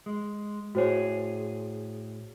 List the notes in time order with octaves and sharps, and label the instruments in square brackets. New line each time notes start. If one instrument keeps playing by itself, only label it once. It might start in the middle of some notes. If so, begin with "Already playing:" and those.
[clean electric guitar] G#3
[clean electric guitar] A2 G#4 [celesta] F#4 C5 C#5